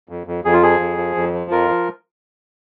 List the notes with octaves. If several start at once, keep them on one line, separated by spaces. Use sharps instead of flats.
F2
F2
F2 G#4
F4
F3 G#4
F2
F3
F2
F3
F2 F4 A#4
F3